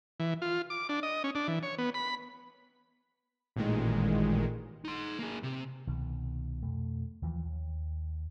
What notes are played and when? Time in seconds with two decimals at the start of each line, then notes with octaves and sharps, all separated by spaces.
0.20 E3
0.42 F4
0.70 D6
0.89 D4
1.03 D#5
1.24 C#4
1.35 D4
1.48 E3
1.63 C#5
1.78 B3
1.94 B5
3.56 A1 A#2 D#3 G#3
4.85 D#4 C6
5.19 A#3 G#4
5.43 C3
5.87 C2 B2 D#3
6.63 F2 B2 A3
7.22 D#2 E3 F3
7.45 D#2